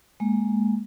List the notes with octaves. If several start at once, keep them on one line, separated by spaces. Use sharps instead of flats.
G#3 A#3